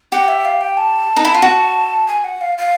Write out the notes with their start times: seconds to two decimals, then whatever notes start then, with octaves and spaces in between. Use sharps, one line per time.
0.12 G4 F#5
0.28 E5
0.45 F5
0.61 G5
0.77 A5
1.16 D#4
1.25 E4
1.34 F4
1.42 F#4
2.08 G#5
2.24 F#5
2.41 F5
2.58 F5